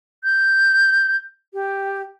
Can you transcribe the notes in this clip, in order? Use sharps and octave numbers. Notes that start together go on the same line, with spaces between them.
G6
G4